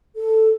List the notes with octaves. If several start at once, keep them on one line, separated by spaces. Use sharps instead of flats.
A4